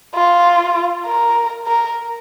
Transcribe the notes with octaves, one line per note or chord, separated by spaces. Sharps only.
F4
A#4
A#4